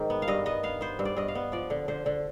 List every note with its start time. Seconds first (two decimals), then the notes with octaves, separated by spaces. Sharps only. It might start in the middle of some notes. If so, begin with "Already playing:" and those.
Already playing: G#2 D#3
0.10 B3
0.22 F5
0.28 G2 D#5
0.46 B3 D#5
0.63 B3 F5
0.81 B3 C5
0.99 G2
1.05 D5
1.17 G2 D#5
1.28 F5
1.35 B3
1.52 F3 D5
1.70 D3
1.88 D3 C5
2.06 D3